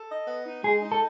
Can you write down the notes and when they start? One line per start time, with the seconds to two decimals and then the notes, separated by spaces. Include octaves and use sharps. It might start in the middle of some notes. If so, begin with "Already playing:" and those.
Already playing: A4
0.10 D#5
0.28 B3
0.46 D#4
0.64 G#3 G#4
0.82 D#4
0.92 A4